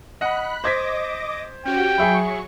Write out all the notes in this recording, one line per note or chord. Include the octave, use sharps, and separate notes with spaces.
D#5 F#5 B5 F#6
C5 D#5 D6 G#6 A#6 B6
C#4 F#4 G4 G5
F#3 G#4 E5 B5 C#6 C#7